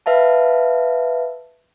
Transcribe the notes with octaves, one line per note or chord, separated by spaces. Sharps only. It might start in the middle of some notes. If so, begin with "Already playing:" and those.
B4 E5 F5 A5